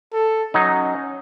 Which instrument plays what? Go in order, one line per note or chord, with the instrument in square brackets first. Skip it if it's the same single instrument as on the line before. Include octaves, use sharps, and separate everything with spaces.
[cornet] A4
[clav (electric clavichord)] F#3 D#4 [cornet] C#4